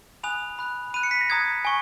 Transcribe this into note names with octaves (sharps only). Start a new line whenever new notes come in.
G#5 B5 D#6 F#6 F7
B5 F#6
B5 F#6 D#7
C#7
B6
A#6
A#5 D#6 F#6 G#6
G#5 C#6